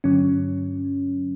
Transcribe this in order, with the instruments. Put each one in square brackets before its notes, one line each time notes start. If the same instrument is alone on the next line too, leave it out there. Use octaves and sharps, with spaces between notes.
[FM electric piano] G2 D3 F#3 C#4